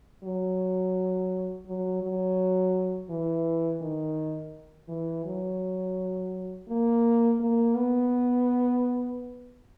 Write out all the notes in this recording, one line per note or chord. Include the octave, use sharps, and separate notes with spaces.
F#3
F#3
F#3
E3
D#3
E3
F#3
A#3
A#3
B3